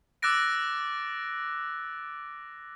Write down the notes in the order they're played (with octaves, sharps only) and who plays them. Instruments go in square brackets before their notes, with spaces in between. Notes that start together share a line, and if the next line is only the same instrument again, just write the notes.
[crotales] D6 E6 F#6 A6 A#6 D7